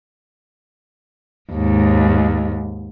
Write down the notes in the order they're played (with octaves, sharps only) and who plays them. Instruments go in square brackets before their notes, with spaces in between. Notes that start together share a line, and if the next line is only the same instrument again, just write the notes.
[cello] D#2 G#2